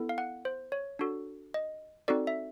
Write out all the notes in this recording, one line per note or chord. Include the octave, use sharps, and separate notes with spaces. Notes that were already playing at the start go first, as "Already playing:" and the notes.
Already playing: B3 E4 A4
F5
F#5
C5
C#5
D4 F#4 A4
D#5
C4 D#4 F#4 A4 D5
E5